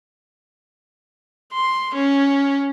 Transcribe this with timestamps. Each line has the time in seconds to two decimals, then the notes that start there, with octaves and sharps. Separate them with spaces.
1.54 C6
1.95 C#4